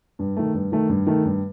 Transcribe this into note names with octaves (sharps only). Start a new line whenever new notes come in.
G2
D#3 A3
G2
D#3 A3
G2
D#3 A3
G2